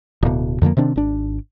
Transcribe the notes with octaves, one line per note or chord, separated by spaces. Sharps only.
D1 B2
F2 D3 F3 A#3
C3 D#3 C4 D4
G#1 D4